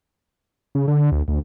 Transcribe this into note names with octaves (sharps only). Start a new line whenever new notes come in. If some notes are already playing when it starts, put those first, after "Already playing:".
C#3
D3
D2
D2